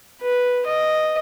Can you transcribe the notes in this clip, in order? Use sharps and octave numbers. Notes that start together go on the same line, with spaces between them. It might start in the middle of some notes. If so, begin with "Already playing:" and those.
B4
D#5